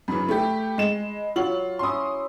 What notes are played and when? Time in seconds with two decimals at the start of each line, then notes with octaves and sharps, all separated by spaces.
0.08 F#2 C#3 E3 B5
0.29 A3 G4
0.78 G#3 E7
1.36 F#3 F4 F#7
1.79 C#4 E4 C6 D#6